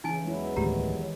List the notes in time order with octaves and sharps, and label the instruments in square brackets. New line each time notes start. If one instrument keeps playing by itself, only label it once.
[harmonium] C#3 [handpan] E3 C#4 E4 [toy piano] D#4 G#5
[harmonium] E2 F#3 [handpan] G#3 E4
[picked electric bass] D1 D2 A2 [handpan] D#3 E3 G#3 [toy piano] G4 A#5